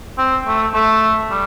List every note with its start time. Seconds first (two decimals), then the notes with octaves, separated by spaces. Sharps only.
0.18 C4
0.47 A3
0.74 A3
1.31 G3